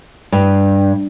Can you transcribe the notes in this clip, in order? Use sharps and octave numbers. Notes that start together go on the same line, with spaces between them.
G2